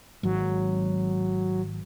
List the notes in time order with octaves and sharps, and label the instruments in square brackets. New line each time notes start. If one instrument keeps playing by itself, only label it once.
[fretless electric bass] G#1 [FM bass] F#3